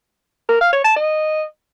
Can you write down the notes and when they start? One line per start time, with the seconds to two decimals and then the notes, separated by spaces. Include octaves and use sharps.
0.49 A#4
0.61 F5
0.73 C#5
0.84 A5
0.96 D#5